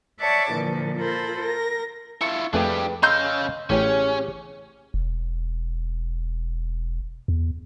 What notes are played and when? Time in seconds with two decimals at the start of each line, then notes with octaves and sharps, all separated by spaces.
0.20 C#5 D5 E5 F#5 A5 D6
0.53 A#2 D3 E3 F3
1.00 F4 A4 A#4 C5 B5
1.41 A#4 A#6
2.21 E4 F4 C#6
2.54 F2 A3 D4 G4 G#4 B4 G5 G#5
3.03 C#4 D#5 F5 C6 E6 G6
3.70 A1 A2 C#4 G4 G#4 C#5 G5
4.94 E1
7.28 E2